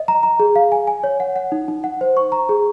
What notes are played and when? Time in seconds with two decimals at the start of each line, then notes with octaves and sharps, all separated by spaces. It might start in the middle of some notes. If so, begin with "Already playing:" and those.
Already playing: D#5
0.08 A#5
0.23 A#5
0.40 G#4
0.56 F5
0.72 G#5
0.87 G#5
1.04 C#5
1.20 F#5
1.36 F#5
1.52 D#4
1.68 D#4
1.84 F#5
2.01 C5
2.17 C#6
2.32 A#5
2.49 G#4